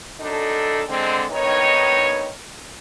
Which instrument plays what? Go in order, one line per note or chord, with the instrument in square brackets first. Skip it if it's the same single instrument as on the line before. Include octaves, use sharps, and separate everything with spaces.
[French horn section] F#2 D4 D#4 A4
D3 G#3 C4
G2 D#3 B3 D#4 C#5